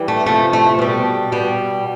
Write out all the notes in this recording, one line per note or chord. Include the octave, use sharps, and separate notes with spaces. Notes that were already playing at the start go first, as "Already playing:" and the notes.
Already playing: E3 G3
A3
C3 F3 A3
A3
B2 G3
B2 G3